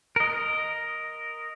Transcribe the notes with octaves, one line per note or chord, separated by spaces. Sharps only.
A#4 D#5